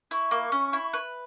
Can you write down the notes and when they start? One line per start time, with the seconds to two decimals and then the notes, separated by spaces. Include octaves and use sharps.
0.11 E4 C#6
0.31 A#3
0.52 C#4
0.73 E4
0.93 B4